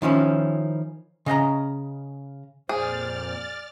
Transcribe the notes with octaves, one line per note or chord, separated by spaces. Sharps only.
D#3 F3 C#4 E4
C#3 D#5 F#5 A#5
F2 A#2 G#4 C5 D5 F6 A6